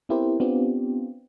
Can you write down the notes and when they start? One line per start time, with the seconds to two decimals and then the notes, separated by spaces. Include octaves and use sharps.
0.09 B3 C4 E4 G4 A#4 C5
0.40 B3 C4 D4 F4 G4